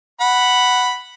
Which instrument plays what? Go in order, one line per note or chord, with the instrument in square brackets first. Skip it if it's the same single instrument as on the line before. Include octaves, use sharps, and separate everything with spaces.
[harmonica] F#5 B5